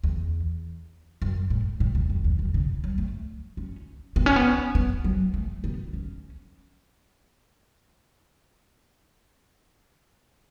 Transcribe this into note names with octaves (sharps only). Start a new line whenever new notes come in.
E2
F#2
A2
A2
E2
F#2
E2
F#2
C#3
F#3
A3
C#4
B3
C#4
B3
B3
F#3
A3
B3
C#4